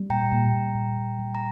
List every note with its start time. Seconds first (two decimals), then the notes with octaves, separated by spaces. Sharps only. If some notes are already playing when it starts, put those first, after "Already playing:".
Already playing: G3
0.10 A#2 G5 A#5
0.32 A#2
0.53 A#2
0.75 A#2
0.97 A#2
1.19 G3
1.35 A#5